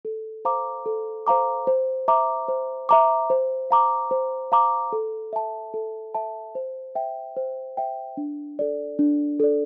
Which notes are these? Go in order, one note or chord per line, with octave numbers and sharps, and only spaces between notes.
A4
C5 F5 A#5 D6
A4
C5 F5 A#5 D6
C5
E5 A#5 D6
C5
E5 A#5 D6
C5
F5 A#5 D6
C5
F5 A#5 D6
A4
E5 A5
A4
E5 A5
C5
E5 G5
C5
E5 G5
D4
A4 D5
D4
A4 D5